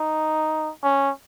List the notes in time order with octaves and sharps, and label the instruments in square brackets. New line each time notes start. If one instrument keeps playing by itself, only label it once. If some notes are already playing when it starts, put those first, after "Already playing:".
Already playing: [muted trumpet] D#4
C#4